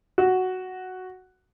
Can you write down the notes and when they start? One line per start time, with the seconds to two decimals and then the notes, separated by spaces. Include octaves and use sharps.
0.18 F#4